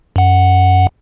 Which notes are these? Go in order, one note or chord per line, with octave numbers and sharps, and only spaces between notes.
F#2 F#5